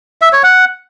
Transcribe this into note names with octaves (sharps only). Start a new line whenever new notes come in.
E5
C#5
F#5